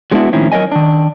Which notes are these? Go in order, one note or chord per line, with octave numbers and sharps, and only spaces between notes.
F#3 G#3 B3 D4 E4 F#4
A2 D#3 F3 C4 C#4 E4
F#3 A#4 C#5 D#5 G#5
D#3 D4